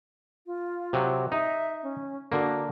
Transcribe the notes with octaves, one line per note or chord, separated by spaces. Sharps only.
F4
C3 F#3
D#4 E5
C#4
D3 A#3 F#4